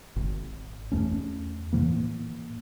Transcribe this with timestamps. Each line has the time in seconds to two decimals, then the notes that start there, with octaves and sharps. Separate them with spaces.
0.16 G#1
0.92 E2 A3 C#4
1.73 A2 E3 A#3